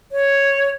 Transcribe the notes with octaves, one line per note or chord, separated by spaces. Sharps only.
C#5